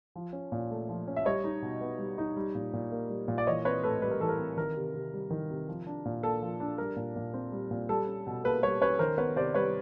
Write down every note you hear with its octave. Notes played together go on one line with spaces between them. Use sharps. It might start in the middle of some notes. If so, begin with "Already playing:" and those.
F3
C#4
A#2
A3
F3
C#4
E5
G3 C#5 D#5
D#4
B2
B3
G3
D#4
G3
A#2
A#2
A#3
G3
A#2
D5
E3 C#5 D#5
C4 B4 C#5
A2 A4 B4
G3 B4
A#4
E3 A4
A#4
C4
D#3 A#4
C3
C3
G3
D#3
C3
F3
D4
A#2
A#3 A4
F3
D4
G3 A#4
A#2
A#2
C4
G3
A#2
G3 A4
C#4
B2
A#3 A4 B4
G3 B4 C#5
C#4 B4 C#5
D#3 A#4 C5
B3 B4 C#5
C3 C5 D5
G3 B4 C#5